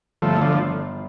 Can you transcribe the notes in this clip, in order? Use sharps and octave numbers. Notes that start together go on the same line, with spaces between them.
G1 F3 A3
D3 F3